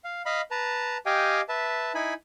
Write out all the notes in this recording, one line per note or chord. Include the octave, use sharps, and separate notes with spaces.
F5
D#5 F5 B5
B4 A5 A#5
G4 D#5 F5 G5 G#5
B4 E5 A5
D#4 E4 G#5 B5